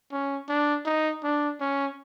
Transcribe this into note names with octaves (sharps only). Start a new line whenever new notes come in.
C#4
D4
D#4
D4
C#4